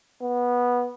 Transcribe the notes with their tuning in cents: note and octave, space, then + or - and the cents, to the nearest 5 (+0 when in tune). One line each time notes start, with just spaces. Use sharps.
B3 -15